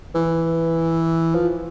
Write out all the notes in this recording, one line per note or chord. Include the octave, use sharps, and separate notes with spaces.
E3
F3